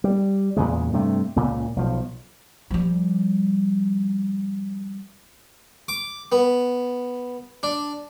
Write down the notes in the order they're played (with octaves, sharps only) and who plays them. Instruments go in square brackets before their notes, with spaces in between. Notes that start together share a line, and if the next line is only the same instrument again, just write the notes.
[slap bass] G3
E2 A#2 C#3 G#3
G2 C3 A3
C#2 A#2 C#3
B1 F3
[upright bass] F3 G3
[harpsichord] D6
B3
D4